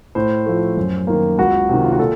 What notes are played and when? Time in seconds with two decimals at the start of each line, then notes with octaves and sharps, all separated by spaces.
0.15 A2 C5
0.46 F3 A3
0.77 F#2
1.07 D#3 A#3
1.38 C#2 F#4
1.69 C3 D#3
1.84 F4
1.92 F#4
1.99 A#2 A4